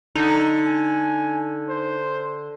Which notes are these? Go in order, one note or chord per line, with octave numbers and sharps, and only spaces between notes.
D3 D#4
G#5
C5